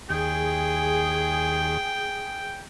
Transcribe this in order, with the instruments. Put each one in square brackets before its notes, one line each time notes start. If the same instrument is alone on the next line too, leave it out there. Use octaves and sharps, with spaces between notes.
[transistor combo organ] D#2 [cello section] G#4 [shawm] G5